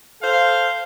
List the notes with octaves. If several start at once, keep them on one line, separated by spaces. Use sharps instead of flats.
A4 C5 F5